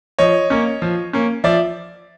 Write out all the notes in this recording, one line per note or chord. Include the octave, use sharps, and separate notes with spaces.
F3 C#5 D#5
A#3 C#4
F3
A#3 C#4
F3 D5 E5